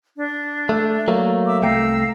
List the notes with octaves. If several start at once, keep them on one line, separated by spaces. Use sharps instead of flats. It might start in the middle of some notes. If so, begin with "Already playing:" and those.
D4
A3
F#3 A3 A#3 D5
E5 D6 E6
C2 A3 F5 G5 A#5 E6